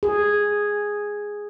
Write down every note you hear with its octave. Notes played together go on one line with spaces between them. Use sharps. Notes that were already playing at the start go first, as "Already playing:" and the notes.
G#4